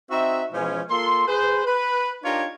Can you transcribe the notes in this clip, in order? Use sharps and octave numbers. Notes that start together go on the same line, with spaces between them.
C4 D#4 F#4 E5
B2 E3 F3 G#3 C#4
A#3 F4 A4 C6
G#4 B4 C5
B4
D4 D#4 F4 G4 A#4 C#5